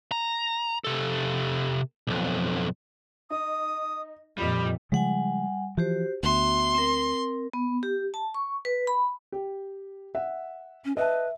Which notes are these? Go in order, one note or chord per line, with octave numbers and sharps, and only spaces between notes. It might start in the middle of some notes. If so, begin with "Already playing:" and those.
A#5
C3 A4
B1 F2
D#4 D#6
F2 A#2 G3 F4 D#5 B5
C#3 F3 G3 G#3 F#5 G#5
E3 F3 F#4 G4 C5
D2 B3 F#4 E5 C6
C4 A#4
B3
G4
A5
C#6
B4
B5
G4
E5 F#5
C#4
B4 D#5 E5 A5